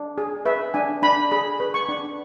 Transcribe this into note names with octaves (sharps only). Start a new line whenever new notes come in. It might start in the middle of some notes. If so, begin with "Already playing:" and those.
Already playing: D4
G#4
B4 E5
D4 G#5
D4 B5
G#4 B5
B4
C#6
D4